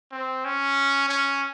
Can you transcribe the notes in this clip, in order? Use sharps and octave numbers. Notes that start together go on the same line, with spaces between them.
C4
C#4
C#4